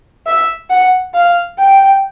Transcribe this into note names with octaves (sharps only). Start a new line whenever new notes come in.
E5
F#5
F5
G5